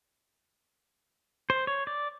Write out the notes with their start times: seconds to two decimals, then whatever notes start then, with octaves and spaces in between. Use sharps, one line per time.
1.50 C5
1.67 C#5
1.87 D5